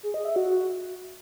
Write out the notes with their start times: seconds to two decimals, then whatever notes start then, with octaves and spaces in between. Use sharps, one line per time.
0.03 G#4
0.14 D#5
0.25 E5
0.36 F#4